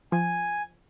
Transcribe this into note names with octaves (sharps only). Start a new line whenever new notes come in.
F3 G#5